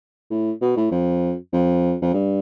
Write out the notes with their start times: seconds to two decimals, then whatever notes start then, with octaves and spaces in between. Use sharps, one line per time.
0.30 A2
0.61 B2
0.77 A2
0.91 F2
1.53 F2
2.02 F2
2.14 G2